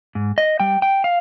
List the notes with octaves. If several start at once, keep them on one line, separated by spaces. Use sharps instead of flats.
G#2
D#5
G3 G5
G5
F5